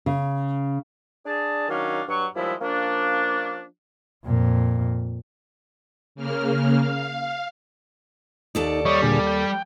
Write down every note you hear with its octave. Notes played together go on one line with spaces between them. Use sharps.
C#3
D4 G#4 A5
D#3 F#3 C#4 D4 F5
G2 F#3 C#6
D#2 F3 G3 G#3 E4 E5
F3 A#3 C#4 D4
F2 A#2
C#3 A#3 F6
F5
D#2 D#4 A4 D5
G3 C#5 D#5 C#6
A#2 D3 G#4
G5